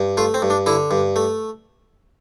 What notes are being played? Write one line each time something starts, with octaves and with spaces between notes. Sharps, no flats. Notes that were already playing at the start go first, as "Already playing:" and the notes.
Already playing: G2
A3 F4
C4
G2
D4
D3 E4
G2
A3